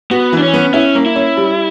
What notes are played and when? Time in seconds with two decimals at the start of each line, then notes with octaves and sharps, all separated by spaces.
0.11 B3 F#4
0.33 E3
0.38 D4
0.42 C#4
0.53 B3
0.74 C#4 E4
0.95 A#3
1.06 E4
1.16 C#4
1.37 G3